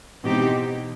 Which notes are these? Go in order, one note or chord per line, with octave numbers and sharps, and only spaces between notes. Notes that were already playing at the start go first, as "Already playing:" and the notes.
B2 E3 G#3 C4 D#4 G4